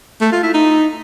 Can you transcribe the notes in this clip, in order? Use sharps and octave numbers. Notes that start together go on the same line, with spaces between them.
A3
F4
E4
D#4